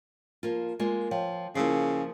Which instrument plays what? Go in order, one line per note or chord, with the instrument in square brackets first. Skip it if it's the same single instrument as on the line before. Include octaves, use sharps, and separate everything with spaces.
[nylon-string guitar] F3 A#3 F4
G#3 A#3 F4
[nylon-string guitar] F3 [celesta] C#5 F5 G5
[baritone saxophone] C#3 [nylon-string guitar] F3 A#3 [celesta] E4 E6 C7